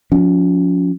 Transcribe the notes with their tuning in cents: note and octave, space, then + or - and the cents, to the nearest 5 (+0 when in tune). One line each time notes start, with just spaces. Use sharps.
F3 +35 C#4 +35